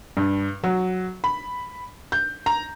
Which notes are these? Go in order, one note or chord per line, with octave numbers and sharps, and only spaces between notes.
G2
F#3
B5
G6
A#5